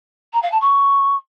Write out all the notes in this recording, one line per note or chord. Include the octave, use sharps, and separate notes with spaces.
A#5
F5
A5
C#6